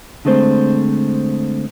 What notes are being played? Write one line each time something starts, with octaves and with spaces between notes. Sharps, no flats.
D3 G#3 A3 C4 C5